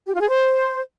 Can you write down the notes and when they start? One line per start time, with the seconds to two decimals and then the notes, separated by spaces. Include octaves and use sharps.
0.07 G4
0.14 F4
0.21 G#4
0.28 C5